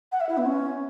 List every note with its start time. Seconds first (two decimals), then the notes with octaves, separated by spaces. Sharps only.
0.12 F#5
0.20 E5
0.29 E4
0.37 B3
0.46 C#4